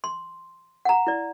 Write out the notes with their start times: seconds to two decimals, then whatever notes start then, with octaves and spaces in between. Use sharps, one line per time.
0.04 C6
0.85 F#5 A#5
1.07 E4 D5